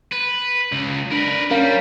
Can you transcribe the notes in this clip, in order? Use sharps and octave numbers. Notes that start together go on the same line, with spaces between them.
B4
C#2
D4 A#4 B4
G3 C#4 A#4 F5